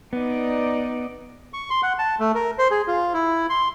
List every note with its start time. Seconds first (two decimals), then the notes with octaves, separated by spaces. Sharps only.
0.13 B3 D#4 D5
1.53 C#6
1.70 C6
1.83 F#5
1.99 A5
2.20 A3
2.35 A#4
2.58 C5
2.71 G#4
2.87 F4
3.14 E4
3.50 C6